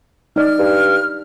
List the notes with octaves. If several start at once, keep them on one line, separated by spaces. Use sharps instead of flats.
D#4 D5 D#5 F6
G2